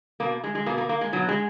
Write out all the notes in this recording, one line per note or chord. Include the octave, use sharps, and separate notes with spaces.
B2 A#3
G#3
G#3
B2 A#3
A#3
A#3
G#3
B2 F#3
G#3